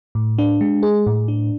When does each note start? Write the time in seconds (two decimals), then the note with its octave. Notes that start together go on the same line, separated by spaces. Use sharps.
0.15 A2
0.39 D4
0.61 G#3
0.83 G#4
1.07 A2
1.28 D4